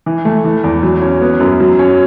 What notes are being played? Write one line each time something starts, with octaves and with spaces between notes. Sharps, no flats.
E3
A3
E3
E2
F#3
C#4
B3
F#2
F#3
C#4